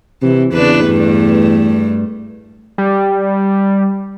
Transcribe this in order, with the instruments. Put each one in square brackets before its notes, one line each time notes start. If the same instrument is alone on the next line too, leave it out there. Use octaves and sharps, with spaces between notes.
[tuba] C3 [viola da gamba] E3
[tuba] E2 [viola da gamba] C#3 D4 B4
[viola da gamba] G2 A3
[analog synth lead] G3